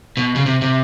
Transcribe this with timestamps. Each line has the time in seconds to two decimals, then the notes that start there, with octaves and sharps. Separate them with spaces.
0.17 B2
0.36 C#3
0.46 C3
0.62 C3